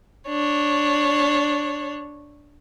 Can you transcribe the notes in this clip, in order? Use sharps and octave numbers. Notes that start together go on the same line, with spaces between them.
D4 C#5